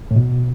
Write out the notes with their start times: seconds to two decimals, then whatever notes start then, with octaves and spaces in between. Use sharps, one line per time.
0.11 A2
0.16 B2